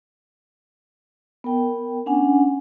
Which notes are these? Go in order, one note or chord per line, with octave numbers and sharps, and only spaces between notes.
B3 A#4 G5
C#4 D4 F#5 G#5